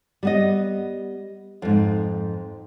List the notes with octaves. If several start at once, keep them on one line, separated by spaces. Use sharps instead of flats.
G3 B3 D#5
F2 G#2